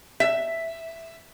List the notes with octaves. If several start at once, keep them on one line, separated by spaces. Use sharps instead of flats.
E5